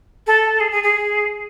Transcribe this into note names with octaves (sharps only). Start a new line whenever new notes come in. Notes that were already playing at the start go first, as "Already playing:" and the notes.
A4
G#4
G#4
G#4